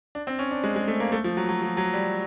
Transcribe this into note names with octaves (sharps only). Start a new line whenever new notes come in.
D4
C4
C#4
D4
G#3
G#3
A3
A#3
A3
F3
F#3
F#3
F3
F#3
G3